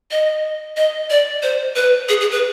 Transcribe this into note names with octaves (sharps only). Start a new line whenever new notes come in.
D#5
D#5
D5
C5
B4
G#4
G#4
B4